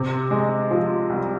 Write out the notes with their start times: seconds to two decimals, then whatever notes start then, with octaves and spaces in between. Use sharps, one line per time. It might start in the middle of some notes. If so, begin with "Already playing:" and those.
Already playing: C3
0.31 G#3
0.71 F3
1.10 C2